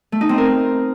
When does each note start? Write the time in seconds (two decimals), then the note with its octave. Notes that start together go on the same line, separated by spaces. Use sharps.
0.12 A3
0.21 D#4
0.29 C4
0.38 A#4